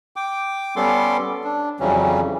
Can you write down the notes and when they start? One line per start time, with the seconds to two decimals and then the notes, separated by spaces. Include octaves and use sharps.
0.16 G5 D6
0.76 G3 B3 C#4 A4 C6 D6
1.44 D4
1.80 F2 C#3 E3 F#3 G3 C#4